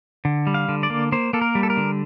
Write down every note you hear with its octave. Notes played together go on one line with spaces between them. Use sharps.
D3
G3
F5
D3
D5
A#3
A#3 C5
A#3 A4
A#4
G3
A4
A#4
D3